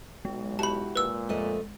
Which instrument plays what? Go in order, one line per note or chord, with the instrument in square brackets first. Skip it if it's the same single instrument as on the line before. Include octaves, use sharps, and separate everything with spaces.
[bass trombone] B1 [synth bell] G#3
[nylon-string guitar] E4 F#4 G4 [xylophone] A5 B5
[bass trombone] A#2 [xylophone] B4 E6
[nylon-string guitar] F2 A3 D#5